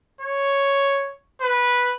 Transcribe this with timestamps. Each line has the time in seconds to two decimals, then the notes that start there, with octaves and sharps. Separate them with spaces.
0.21 C#5
1.41 B4